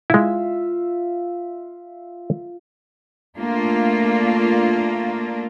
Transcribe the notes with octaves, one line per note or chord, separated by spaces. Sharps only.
G#3 E4 F4 E5
A3 A#3 D4 F4